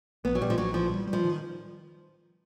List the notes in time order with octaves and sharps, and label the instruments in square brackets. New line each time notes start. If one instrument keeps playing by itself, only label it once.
[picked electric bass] A#1 [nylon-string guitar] B3
[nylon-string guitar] F#3
[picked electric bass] A#1 [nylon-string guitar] G3
[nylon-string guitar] F3
[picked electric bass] A#1 [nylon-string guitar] F#3
[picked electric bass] E3 [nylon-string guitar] F3
[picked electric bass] G3
G3
[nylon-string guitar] F3
[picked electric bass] D#3